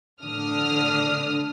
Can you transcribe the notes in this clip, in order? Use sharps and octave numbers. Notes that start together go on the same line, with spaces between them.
A2 D3 D4 D#6 F6